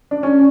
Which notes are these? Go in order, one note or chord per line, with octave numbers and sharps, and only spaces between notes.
D4
C#4